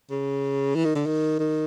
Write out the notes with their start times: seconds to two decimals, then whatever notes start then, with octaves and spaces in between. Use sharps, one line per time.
0.11 C#3
0.75 E3
0.85 D#3
0.95 D3
1.06 D#3
1.40 D#3